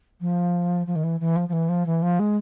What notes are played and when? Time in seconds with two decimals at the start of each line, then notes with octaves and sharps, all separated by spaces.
0.21 F3
0.86 F3
0.95 D#3
1.03 E3
1.20 E3
1.36 F3
1.48 F3
1.52 E3
1.69 F3
1.86 E3
2.02 F3
2.19 G#3